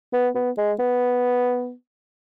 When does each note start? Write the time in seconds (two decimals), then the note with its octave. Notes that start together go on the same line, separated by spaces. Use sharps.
0.13 B3
0.35 B3
0.57 G#3
0.79 B3